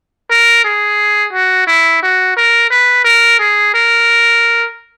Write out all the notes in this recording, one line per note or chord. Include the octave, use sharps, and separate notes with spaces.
A#4
G#4
F#4
E4
F#4
A#4
B4
A#4
G#4
A#4